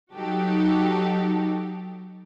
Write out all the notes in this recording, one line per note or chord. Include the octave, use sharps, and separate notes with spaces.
F#3 D#4 F#4 G4 A4